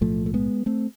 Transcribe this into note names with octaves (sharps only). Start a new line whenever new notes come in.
B1 A2 F3 A3
A3
G#3 B3
A3 C4